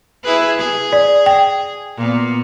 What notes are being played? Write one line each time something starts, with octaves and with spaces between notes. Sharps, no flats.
E4 G#4 B4
G#4
D5
G5
A#2 B3